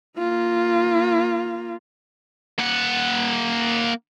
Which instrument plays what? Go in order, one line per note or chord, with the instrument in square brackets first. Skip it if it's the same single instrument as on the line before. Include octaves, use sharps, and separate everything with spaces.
[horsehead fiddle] A#3 F4
[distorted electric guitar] A#3 F#5